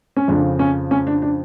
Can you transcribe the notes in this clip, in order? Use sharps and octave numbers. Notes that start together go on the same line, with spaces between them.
C#4
F2 C#3 F3 D4
C#4
C#4
D4
D4